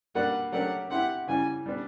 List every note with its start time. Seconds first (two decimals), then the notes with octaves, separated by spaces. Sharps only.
0.15 G3 A#3 D4 F#4 B4 F#5
0.52 F#3 A3 D4 G4 A#4 F#5
0.91 C4 E4 G4 F#5
1.27 C#3 E3 G3 G#5
1.66 G3 B3 D4